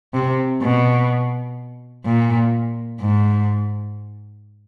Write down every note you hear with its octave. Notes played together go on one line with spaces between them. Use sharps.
C3
B2
A#2
G#2